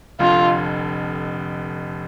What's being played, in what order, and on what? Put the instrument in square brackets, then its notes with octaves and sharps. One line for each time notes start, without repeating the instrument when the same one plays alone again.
[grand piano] F1 F2 D3 [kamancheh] F4